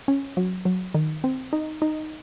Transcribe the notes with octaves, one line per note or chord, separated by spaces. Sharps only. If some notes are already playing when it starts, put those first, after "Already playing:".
C#4
F#3
F#3
D#3
C4
D#4
D#4